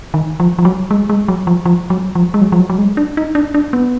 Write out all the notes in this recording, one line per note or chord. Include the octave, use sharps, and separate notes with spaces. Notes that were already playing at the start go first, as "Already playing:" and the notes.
D#3
F3
F3
F#3
G#3
G#3
F#3
F3
F3
F#3
F3
G#3
F#3
F3
F#3
F#3
G#3
D4
D#4
D4
D4
B3